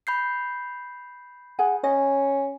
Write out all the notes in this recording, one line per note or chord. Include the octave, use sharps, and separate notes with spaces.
B5 G6 C7
G#4 F#5 G#5
C#4 D#5